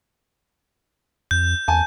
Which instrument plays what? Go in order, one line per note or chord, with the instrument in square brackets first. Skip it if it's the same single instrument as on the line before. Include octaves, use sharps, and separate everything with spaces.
[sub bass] F2 [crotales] G6
[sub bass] E2 [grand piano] G#5 A5